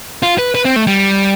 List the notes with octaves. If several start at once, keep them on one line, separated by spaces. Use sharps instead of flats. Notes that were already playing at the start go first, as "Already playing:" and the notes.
F4
B4
B4
C4
A3
G3